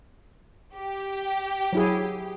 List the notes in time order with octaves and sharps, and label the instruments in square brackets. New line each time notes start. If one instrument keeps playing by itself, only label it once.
[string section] G4
[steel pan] F#3 E4 G#4